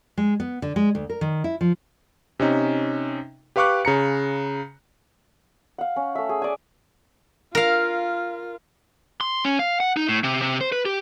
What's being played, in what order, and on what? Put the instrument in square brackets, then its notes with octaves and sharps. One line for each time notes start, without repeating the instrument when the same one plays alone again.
[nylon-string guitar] G#3
B3
D3
G#3
D2
A#4
D#3
E4
F3
[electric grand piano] C3 C#4 D#4
G4 B4 F5 C#6 D6 F#6
C#3 A#5 C#7
[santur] F5 F#5
C#4
A3 E5
G#4
D5 G#5
[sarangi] F4 [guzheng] A#4 F5
[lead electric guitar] C6
C#4
F5
F#5
D#4
A2
C3
C3
C5
B4
G4